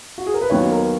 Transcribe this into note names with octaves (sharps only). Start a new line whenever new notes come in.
F#4
G#4
A#4
B4
D#2 D#3 F#3 B3 C#5
A#4